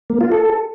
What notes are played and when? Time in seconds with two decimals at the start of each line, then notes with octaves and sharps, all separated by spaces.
0.10 A#3
0.21 F4
0.32 A4